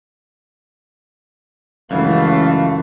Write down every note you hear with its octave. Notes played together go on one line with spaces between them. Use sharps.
C#2 F#2 E3 A3 F5